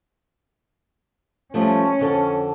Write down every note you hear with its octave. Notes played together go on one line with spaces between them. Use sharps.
F3 G3 A3 C#4
F2 D3 A4